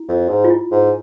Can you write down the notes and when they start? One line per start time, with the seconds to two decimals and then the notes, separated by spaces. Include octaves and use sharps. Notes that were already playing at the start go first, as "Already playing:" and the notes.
Already playing: E4
0.09 F2
0.29 G#2
0.44 F4
0.50 E4
0.72 G#2